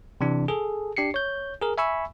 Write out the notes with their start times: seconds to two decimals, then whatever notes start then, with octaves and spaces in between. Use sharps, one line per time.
0.21 C3 E3 D4
0.48 G#4 A4
0.97 D4 G4 C7 C#7
1.14 C#5 G6
1.62 G#4 A#4
1.78 E5 G#5 B5 C#6 E6